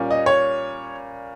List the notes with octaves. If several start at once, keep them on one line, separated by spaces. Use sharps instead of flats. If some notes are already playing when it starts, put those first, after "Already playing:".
Already playing: A#2 G3 C#4
D#5
C#5